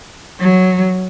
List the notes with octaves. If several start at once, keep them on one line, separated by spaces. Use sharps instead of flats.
F#3